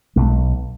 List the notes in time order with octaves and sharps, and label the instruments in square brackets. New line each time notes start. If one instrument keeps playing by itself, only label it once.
[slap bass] B1 G#3